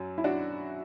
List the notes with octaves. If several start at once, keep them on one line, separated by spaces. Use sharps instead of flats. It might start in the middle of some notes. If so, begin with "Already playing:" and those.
Already playing: F#2 F#3
E4
D4 F#4